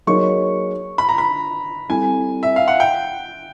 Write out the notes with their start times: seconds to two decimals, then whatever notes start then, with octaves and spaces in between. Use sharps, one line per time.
0.07 F#3 A#3 D#4 G#4 C#5 C#6
0.98 B5
1.09 A#5
1.18 B5
1.89 G3 C4 E4 A4 G#5
2.43 E5
2.56 F5
2.68 F#5
2.80 G5